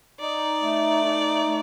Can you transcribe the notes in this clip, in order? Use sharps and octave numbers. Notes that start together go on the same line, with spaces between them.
D#4 D5
A3
D#4
A3